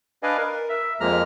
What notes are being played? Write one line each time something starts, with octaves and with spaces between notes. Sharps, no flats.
D4 B4 D5 D#5 F5 G#5
A#4
E5
F2 F3 G#3 A#3 A#5 F6